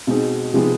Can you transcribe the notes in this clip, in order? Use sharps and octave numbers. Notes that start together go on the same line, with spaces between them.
B2 G#3 C4 D#4
C3 F3 G#3 B3 D#4